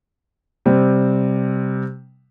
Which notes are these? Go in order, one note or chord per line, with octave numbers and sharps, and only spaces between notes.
C3 G3 C4